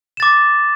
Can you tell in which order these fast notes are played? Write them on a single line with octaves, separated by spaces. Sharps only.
E7 A6 D6